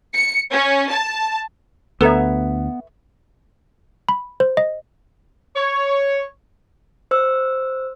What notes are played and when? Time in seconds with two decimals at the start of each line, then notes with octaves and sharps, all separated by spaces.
0.14 C#7
0.51 C#4
0.90 A5
2.01 D2 B3 A4 B4 C#5 E5 A#5
4.09 B5
4.40 C5
4.57 D#5
5.56 C#5
7.11 C5 E6